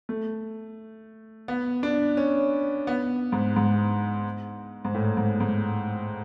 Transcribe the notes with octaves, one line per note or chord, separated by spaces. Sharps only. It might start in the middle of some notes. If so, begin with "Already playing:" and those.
A3
B3
D4
C#4
B3
G#2
G#2
G#2
A2
G#2
G#2